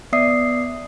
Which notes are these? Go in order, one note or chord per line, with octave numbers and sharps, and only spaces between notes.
B3 D5 E5 D#6 C7